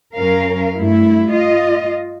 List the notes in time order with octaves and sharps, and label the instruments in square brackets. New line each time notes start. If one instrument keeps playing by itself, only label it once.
[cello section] F#2 C#4 A#4 F5
G2 A3 E4
F4 D#5